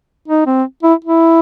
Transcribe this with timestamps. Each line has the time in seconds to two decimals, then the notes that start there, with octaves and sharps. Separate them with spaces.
0.28 D#4
0.47 C4
0.83 E4
1.04 E4